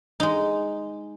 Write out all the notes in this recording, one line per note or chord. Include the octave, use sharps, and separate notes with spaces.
G#3 D#4